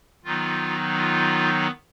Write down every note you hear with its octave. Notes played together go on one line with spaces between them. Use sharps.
D#3 F#3 B3 D#4 F4
F4